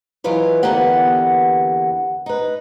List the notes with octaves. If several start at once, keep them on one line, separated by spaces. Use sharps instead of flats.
E3 F#3 G#3 F4 B4 C#5
E2 D3 A#3 B3 G4 F#5
D#4 B4